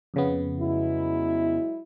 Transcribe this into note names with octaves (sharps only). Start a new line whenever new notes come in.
F2 C#3 B3
F#3 G#3 E4